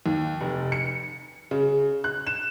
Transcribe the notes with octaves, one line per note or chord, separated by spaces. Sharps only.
D#2
F1
C#7
C#3
F#6
E7